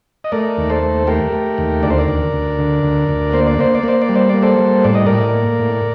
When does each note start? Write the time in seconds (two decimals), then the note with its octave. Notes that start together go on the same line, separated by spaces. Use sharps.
0.24 D#5
0.32 A3 A#4 D5
0.57 D#2
0.70 A4 C5
0.83 A3
1.07 A3 G4 A#4
1.32 A3
1.58 D#2
1.82 D2 D5
1.90 C5
1.98 A#4 D5
2.08 D2
2.33 D2
2.59 D3
2.83 D2
3.09 D2
3.33 A#3 C5
3.47 D5
3.59 A#3 C5
3.75 D5
3.83 A#3 C5
4.02 D5
4.09 G3
4.15 C5
4.29 A#3 D5
4.43 A4 C5
4.59 G3
4.84 A2 D5
4.95 D#5
5.06 A2 A#4 D5
5.35 A#3
5.59 A2